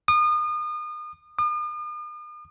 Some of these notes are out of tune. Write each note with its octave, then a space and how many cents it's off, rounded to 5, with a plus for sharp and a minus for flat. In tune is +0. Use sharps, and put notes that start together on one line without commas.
D#6 -35
D#6 -45